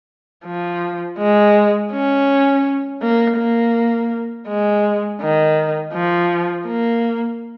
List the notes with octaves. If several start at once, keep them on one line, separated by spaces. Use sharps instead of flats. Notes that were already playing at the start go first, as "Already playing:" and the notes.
F3
G#3
C#4
A#3
A#3
G#3
D#3
F3
A#3